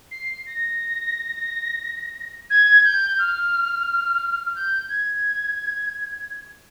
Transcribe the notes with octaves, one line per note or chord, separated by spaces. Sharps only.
C7
A#6
G#6
G6
F6
F6
G6
G#6